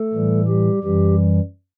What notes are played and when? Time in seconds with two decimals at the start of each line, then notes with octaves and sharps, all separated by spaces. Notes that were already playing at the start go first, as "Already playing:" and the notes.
Already playing: A3 A4
0.13 A2 E3 G3
0.48 G3 G4
0.83 F#2 E3 G3 G4